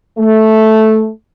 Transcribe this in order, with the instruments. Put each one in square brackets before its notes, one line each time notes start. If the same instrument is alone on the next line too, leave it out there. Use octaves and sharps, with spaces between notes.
[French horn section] A3